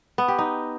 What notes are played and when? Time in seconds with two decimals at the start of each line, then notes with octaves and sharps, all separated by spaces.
0.18 B3
0.28 G4
0.39 D#4